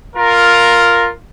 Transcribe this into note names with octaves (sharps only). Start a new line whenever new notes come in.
F4 A#4